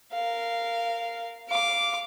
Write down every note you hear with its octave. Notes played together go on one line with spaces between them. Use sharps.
A#4 F5
F5 D6